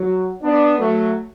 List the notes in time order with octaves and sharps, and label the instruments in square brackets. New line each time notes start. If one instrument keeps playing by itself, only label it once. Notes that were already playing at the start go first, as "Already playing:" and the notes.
Already playing: [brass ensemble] F#3
B3 D4
F#3 A3